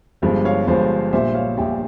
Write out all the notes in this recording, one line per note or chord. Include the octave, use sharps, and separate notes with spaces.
G1 G2 F3 G#3
C#5 F5
G1 G2 F3 G#3 C5
A#1 A#2 G3 C5 E5
C#5 F5
A#1 A#2 G3 E5 G5